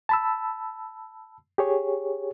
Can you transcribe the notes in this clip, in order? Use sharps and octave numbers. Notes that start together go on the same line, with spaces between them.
A5 B5 E6
G4 G#4 C#5